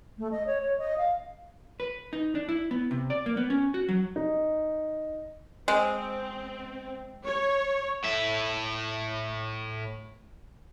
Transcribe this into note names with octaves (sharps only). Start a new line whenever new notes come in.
A3
D#5
C#5
C#5
D#5
F5
B4
D#4
D4
E4
B3
C3
D5
A#3
B3
C#4
F#4
F#3
D#4
G#3 C4
C#5
A2 E5